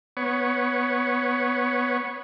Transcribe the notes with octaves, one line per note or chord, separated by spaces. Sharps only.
B3 C#5